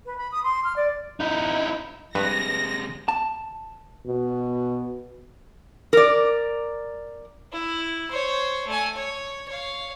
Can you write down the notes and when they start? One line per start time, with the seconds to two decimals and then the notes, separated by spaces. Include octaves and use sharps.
0.06 B4
0.18 B5
0.32 D#6
0.43 C6
0.64 F6
0.76 D5
1.20 D#4 E4
2.15 G2 C3 G#3 B4 A#6
3.08 A5
4.06 B2
5.93 A#4 D5
7.53 E4
8.11 C5 C#5
8.67 A3 G#5
8.96 C#5
9.48 C#5 F5